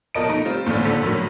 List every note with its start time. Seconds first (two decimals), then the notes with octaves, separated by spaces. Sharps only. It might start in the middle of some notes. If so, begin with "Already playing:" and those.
0.15 B2 F3 A#4 D#5 A5 D7
0.29 A3 D#4 A#5
0.45 G3 C4 F4
0.66 E2 A2 D3 C4 F4 D5
0.85 G#1 A#2 D3 A4 B6
1.02 F2 A2 D3 F#3 A#4